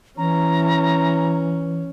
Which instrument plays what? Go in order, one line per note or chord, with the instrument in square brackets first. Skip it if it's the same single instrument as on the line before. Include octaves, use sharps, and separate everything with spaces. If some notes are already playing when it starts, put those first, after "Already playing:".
[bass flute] E3 [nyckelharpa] C#4 [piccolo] A#5